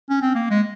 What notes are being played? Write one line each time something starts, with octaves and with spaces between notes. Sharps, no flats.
C#4
C4
A#3
G#3